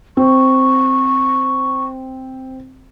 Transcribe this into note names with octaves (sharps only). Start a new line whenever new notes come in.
C4 C#6